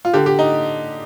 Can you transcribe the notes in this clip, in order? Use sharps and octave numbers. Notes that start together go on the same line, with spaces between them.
F4
D3 G4
G4
D#4